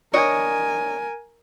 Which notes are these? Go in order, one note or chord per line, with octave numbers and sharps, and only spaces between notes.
D4 A#4 C#5 D#5 G#5